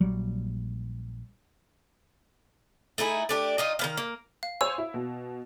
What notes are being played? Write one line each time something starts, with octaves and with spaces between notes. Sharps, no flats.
A#1 F#3 G3
A3 D#4 E4 G#4
A3 D4 G4
D#4 F4 D#5
D#3 B3 F5
A#3
F5
C5 C#5 G#5 E6
E4
B2